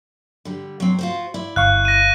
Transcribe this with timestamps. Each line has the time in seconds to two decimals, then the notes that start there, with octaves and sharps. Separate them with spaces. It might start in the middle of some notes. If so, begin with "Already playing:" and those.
0.45 D3 G3
0.80 F#3 C4
0.99 F4 F#4 C5
1.34 E4 D5
1.56 G1 F5 C#6 F#6
1.85 A#6 D#7